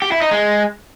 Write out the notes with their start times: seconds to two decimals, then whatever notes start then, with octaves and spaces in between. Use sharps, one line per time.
0.02 G4
0.12 E4
0.22 D#4
0.31 G#3